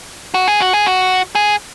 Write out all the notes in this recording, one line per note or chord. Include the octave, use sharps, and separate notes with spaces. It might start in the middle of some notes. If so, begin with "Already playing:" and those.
F#4
G#4
F#4
G#4
F#4
G#4